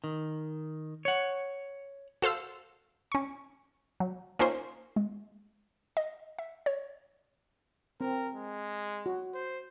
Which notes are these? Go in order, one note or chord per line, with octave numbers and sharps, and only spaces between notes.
D#3
C#5 F#5
F#4 A4 C5 F5 E6
C#4 C#6
F#3
A#3 C#4 D#4 F4 C5
G#3
D#5
E5
C#5
C4 A#4
G#3
F#4
C5